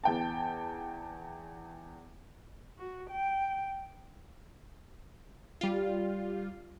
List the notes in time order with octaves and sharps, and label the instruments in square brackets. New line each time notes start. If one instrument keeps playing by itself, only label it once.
[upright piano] E2 G5 A5
[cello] F#4
G5
[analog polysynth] G3 F4